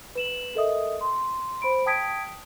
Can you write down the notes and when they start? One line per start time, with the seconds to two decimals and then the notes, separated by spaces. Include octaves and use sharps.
0.15 B4 E7 F#7
0.55 A4 A#4 D#5 E5 D#6
1.01 C6
1.62 C5 B5 D7
1.86 G5 A5 D#6 G#6 B6 D7